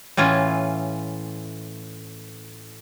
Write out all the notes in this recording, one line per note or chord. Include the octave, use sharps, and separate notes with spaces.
A2 E3 C#4 F4